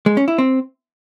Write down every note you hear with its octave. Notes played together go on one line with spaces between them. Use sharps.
G#3
C#4
E4
C4